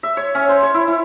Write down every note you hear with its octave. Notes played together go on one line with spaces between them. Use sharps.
E5
C#5
C#4
C5
C#5
E4
E4